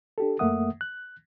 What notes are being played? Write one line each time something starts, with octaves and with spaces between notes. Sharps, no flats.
D4 G4 A4
F#2 A3 A#3 E5 F#5 D#6
F#6